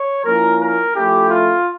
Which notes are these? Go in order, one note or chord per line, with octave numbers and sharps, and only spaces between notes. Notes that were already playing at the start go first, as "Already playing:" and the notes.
Already playing: C#5
F3 A#3 C#4 E4 A#4
A#4
F3 A3 C#4 E4 G4
F4